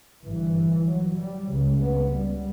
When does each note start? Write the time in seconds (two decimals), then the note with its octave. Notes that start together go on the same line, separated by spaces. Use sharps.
0.24 G1 G2 E3
0.86 F#3
1.18 G3
1.49 C#2 C#3
1.80 B3
2.10 G3